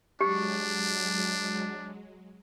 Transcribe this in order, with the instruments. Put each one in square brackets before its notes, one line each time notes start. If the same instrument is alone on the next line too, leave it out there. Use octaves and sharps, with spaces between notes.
[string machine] F#3 G#3 [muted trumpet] D4 [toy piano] G4